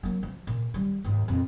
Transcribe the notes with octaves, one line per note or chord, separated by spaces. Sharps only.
F#3 A#3
F3
A#2
D#3 G3
D#2 G#2
F2 A#2